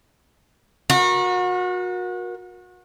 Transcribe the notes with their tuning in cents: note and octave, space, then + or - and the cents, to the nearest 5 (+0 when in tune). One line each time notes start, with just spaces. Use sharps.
F#4 -30 A#4 +30